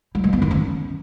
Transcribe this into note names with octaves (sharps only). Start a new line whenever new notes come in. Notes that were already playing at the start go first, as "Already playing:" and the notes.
G3
G#3
B3
D#3
C#4